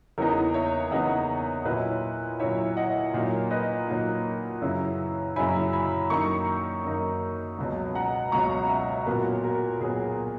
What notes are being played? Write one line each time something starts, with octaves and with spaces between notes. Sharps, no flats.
E2 C#3 E3 B3 D#4 A#4 C#5
C#5 E5
E2 C#3 E3 B3 D#4 D#5 F#5
A#2 F#3 C#4 E4 B4 D#5
A#2 F#3 C#4 E4 C#5 E5
D#5 F#5
A#2 F#3 A#3 D#4
B4 D#5
A#2 F#3 A#3 D#4
F#2 C#3 F#3 C#4 E4
F#2 C#3 F#3 C#4 E4 G#5 B5
G#5 B5
F#2 D#3 A#3 D#4 A#5 C#6
F#2 D#3 A#3 D#4
C#2 B2 F#3
F#5 A#5
C#2 B2 F#3 A#5 C#6
C#5 E5
A#2 F#3 B3 F#4 A#4
F#4 A#4
A#2 F#3 B3 G#4